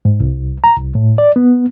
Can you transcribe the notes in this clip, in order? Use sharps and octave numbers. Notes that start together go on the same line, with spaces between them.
G#2
C2
A#5
C2
A2
D5
B3